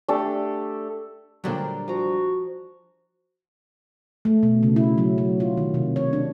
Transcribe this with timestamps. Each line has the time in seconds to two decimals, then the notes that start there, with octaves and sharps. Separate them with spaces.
0.08 A3 D4 G4 A4
1.44 A#2 D3 F#3 G3 D4 A#4 C5 G5
1.88 F3 F#4 A#5
4.25 A3
4.43 B2
4.63 C#3
4.76 E4
4.98 F#3
5.18 F#3
5.40 F4
5.57 D#3
5.74 C3
5.96 C#5
6.13 D4